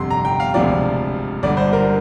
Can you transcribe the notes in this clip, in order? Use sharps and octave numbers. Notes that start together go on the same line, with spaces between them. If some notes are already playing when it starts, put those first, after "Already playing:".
Already playing: G1 F2 C3 C6
A#5
G5
F5
E1 D2 C3 F3 D5
G1 G2 D3 D5
C5
A#4